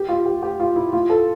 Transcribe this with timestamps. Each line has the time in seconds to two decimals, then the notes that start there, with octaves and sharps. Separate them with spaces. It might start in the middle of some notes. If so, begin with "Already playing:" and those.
Already playing: G4
0.09 F4
0.26 G4
0.42 G4
0.60 F4
0.76 E4
0.93 F4
1.10 A4